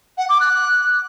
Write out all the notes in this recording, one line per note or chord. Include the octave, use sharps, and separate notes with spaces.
F#5
D6
F#6